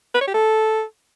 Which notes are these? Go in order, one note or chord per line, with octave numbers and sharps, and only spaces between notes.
B4
C#5
G4
A4